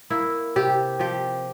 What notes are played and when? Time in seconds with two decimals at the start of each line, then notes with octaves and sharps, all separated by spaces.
0.10 A#3 E4
0.56 C3 G4
0.99 F3 G4